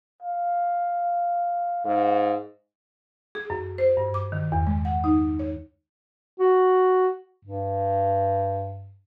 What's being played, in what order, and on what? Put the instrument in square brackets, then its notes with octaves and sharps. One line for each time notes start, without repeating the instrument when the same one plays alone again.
[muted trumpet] F5
[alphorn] G#2 [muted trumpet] F5
[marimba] G#4
F#2
C5
G2
D6
D#3
E2
G#3
F#5
D#4
C#5
[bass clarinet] F#4
G2